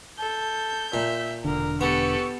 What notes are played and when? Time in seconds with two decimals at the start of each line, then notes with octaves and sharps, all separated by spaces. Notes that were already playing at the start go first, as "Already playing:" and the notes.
0.19 A4 G6
0.94 A#2 E5
1.45 E1 D3 A#4
1.81 B3 G4 A4 B4 C#6